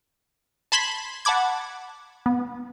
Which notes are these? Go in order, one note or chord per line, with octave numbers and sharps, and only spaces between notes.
A5 B5 C6 G#6 B6
F#5 A5 B5 D6 G#6
B3